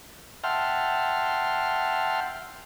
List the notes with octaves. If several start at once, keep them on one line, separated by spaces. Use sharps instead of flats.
E5 F#5 G5 A5 C6 F6